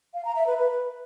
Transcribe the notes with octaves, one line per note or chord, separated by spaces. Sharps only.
F5
A#5
E5
B4
B4